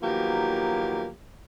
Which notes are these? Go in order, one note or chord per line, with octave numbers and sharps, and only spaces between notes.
D#3 F3 F#3 A#3 B3 G4